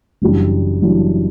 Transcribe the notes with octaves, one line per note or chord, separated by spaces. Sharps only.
F#1 F#2 E3 G3 D4
F#1 F#2 E3 G3 D4